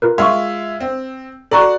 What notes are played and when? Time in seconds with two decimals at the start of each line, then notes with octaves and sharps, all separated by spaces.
0.02 F4 A#4 B4
0.18 G#3 F4 E5 C6 C#6
0.80 C4
1.51 F#4 A4 D5 A#5 C#6